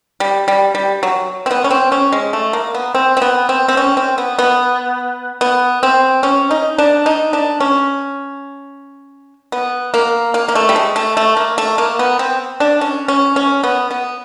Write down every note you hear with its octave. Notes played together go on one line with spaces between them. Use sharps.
G3
G3
G3
F#3
C4
B3
C#4
C4
C#4
G#3
A3
A#3
B3
C4
C4
B3
C4
C4
C#4
C4
B3
B3
B3
C4
C#4
D#4
D4
D#4
D4
C#4
B3
A#3
A#3
A#3
A3
G3
G#3
A3
A3
A#3
A3
A#3
B3
C4
D4
C#4
C#4
C#4
B3
B3